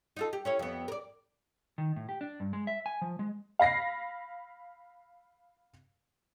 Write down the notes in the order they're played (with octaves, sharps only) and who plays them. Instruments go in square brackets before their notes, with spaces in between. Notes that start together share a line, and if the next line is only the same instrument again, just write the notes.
[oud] D#4 F4 A4
G4
C#4 E4 C#5
F2 B3
A#4 D5
[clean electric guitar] D#3
A2
G4
D4
G2
G#3
E5
G#5
F3
G#3
[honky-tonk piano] F5 B5 A#6 C7